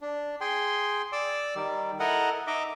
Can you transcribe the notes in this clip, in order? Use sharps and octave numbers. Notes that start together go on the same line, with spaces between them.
D4
G#4 G5 C6
D5 D6 E6
D#3 G3
E4 A4 A#4 D#5 F#5
D#4 D#5 E5 D6